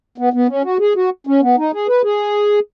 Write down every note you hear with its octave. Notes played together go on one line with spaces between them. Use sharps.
B3
B3
C#4
F#4
G#4
F#4
C#4
B3
D#4
G#4
B4
G#4